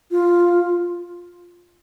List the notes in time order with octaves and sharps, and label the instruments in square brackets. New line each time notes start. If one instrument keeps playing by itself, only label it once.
[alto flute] F4